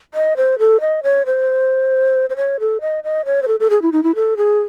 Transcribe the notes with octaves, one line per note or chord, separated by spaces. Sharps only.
D#5
C5
A4
D#5
C#5
C5
C5
C#5
A4
D#5
D#5
C#5
C5
A4
A4
G#4
E4
D#4
E4
A4
G#4